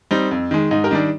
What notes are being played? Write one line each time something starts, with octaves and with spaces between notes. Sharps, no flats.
G3 C4 D#4
F2
D#3 G#3
G#2 D#4
G4 A#4
D#3 G3 D4